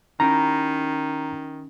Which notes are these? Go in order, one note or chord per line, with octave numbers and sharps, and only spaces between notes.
D#3 C#4 E4 G4 A#5